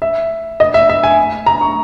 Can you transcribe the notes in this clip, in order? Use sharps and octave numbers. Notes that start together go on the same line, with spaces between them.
E5
D#5
E5
E5
G#5
A#5
C#6